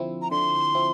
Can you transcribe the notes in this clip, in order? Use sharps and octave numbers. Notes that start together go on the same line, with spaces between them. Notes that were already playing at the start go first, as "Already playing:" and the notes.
Already playing: D3 F3 C4 E4
A#5
D3 C6
F3 C4 E4